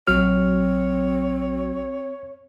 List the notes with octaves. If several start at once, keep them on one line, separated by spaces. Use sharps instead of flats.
A#1 F#3 C4 F#4 C#5 F6